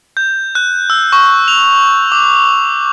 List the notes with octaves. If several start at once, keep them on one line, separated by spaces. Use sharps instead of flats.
G6
F#6
E6
C#6
F7
D6